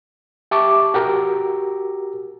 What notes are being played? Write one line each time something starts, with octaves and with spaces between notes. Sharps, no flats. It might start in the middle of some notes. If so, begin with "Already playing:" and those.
G4 E5 A5 C#6 D6
F#4 G4 A#4 A#5